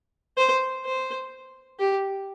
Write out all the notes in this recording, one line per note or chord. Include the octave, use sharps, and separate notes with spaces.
C5
C5
G4